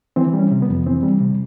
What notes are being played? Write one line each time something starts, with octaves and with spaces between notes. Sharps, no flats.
E3 C4
G3
C#4
C3
B3
F2
E3 C4
G3
C3